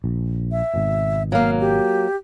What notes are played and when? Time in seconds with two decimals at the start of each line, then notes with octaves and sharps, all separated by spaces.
0.04 A#1
0.52 E5
0.74 G#1 B2
1.32 F#3 A#3 F5
1.60 G4